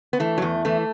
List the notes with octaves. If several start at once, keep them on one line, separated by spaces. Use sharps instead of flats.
B3
E3 A3
F#3
E2 A3
E3 A3